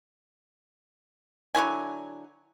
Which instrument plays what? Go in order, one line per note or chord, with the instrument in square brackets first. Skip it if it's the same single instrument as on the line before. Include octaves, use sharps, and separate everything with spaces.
[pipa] D3 F#3 E4 G#5